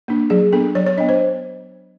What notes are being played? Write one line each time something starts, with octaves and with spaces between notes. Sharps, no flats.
A#3 D4
F#3 G#4
B3 D4 A4
F#3 C#5
C#5
B3 D4 D#5
C5